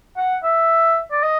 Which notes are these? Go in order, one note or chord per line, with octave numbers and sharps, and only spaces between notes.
F#5
E5
D5
D#5